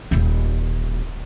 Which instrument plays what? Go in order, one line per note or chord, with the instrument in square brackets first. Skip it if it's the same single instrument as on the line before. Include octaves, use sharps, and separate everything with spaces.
[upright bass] D#1 F4